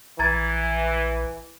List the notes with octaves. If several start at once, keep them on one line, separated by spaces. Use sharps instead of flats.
A#1 E3 A#5 G#6 A6